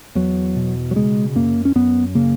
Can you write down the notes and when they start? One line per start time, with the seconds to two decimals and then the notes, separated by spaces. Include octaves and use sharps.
0.15 E2 F#3
0.56 B2
0.91 F#3
0.96 C#3 G#3
1.35 F#2 A#3
1.65 C#4
1.75 F#2 B3
2.15 C#3 A#3